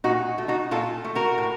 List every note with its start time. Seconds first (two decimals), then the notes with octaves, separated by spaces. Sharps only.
0.04 A#2 D#4 F#4
0.38 A3
0.48 D#4 F#4
0.71 A#2 F4 A4
1.04 A3
1.15 F#4 A#4
1.38 A2